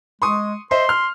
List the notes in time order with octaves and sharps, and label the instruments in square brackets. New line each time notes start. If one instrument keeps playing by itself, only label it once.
[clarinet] G#3 [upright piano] C6 C#6 D#6
[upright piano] C5 D#5 E5 [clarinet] C6
[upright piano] F6